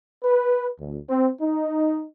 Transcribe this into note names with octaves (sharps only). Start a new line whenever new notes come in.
B4
D2
C4
D#4